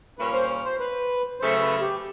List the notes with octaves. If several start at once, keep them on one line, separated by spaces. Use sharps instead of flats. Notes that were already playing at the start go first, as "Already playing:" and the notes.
A#2 G3 A#3 C#4 B4
C5
C5
B4
C#3 F#3 A3 C5
B4
G4